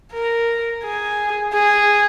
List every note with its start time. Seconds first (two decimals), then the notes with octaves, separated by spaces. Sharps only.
0.13 A#4
0.83 G#4
1.53 G#4